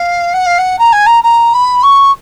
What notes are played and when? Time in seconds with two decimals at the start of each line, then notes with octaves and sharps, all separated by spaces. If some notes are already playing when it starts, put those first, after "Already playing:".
Already playing: F5
0.34 F#5
0.46 F5
0.58 F#5
0.79 A#5
0.93 G#5
1.06 A#5
1.23 A#5
1.54 B5
1.83 C#6